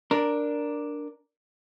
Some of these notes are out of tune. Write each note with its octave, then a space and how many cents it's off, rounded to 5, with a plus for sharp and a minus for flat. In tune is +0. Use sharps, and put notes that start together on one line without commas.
D4 +0 A#4 +0